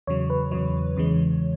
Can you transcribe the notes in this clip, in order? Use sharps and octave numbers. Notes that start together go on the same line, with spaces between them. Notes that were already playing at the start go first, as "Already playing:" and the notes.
E2 C#3 F#3 C#5
B4
E2 C#3 F#3 C#5
E2 C#3 E3 G#3